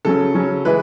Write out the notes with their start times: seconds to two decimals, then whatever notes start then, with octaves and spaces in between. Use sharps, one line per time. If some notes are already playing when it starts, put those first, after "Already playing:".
0.05 C#3 F#3 C#4 A4
0.35 C#3 F#3 C#4
0.65 E3 G#3 B4